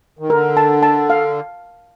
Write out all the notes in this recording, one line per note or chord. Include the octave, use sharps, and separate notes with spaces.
D#3
D3 A#4
A5
A5
F5